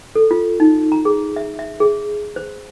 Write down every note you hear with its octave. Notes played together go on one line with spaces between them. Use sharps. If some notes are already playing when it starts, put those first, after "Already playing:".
A4
F4
D#4
A#5
G#4
E5
E5
G#4
C5